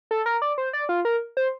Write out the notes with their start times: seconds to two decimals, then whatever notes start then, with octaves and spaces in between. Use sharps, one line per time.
0.11 A4
0.26 A#4
0.42 D5
0.58 C5
0.73 D5
0.89 F4
1.05 A#4
1.37 C5